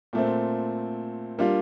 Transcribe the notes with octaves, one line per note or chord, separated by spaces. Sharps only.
A#2 A3 C4
G3 A#3 D4 F4